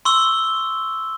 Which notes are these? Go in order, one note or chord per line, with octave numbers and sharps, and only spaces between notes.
C6 C#6 E6 G7